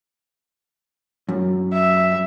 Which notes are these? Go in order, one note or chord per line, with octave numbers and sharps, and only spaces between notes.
F#2
E5